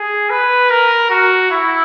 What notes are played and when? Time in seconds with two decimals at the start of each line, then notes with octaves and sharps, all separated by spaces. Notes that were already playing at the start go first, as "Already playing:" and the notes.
Already playing: G#4
0.30 B4
0.70 A#4
1.10 F#4
1.51 E4